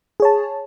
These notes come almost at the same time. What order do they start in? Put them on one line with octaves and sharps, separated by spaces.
G#4 C#5 A5